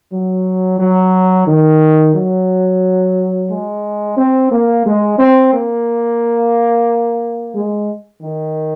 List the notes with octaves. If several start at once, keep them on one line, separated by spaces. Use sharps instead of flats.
F#3
F#3
D#3
F#3
G#3
C4
A#3
G#3
C4
A#3
G#3
D#3